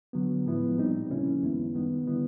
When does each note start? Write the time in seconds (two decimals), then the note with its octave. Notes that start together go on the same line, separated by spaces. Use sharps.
0.13 D3 F#3 B3
0.46 A2 F3 G#3 B3 E4
0.77 A#2 G3 C4 D#4
1.10 C#3 F3 A#3 C#4 E4
1.42 F#2 D#3 G#3 B3 E4
1.74 D#3 G3 B3 D#4
2.06 D3 G3 B3 E4